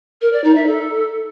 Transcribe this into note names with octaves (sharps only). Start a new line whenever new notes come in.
A#4
D5
D#4
E5
A4